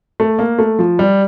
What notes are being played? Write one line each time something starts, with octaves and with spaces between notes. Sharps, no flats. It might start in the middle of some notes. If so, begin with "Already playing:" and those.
A3
A#3
A3
F3
G3